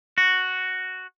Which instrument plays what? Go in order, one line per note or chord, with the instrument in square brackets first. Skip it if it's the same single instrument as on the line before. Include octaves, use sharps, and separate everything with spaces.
[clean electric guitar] F#4